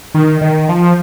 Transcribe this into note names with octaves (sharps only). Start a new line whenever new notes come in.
D#3
D#3
F3